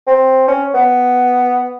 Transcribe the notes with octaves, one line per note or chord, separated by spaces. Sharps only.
C4
C#4
B3